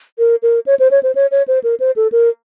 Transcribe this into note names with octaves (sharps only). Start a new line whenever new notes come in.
A#4
A#4
C#5
C5
C#5
C5
C#5
C#5
C5
A#4
C5
A4
A#4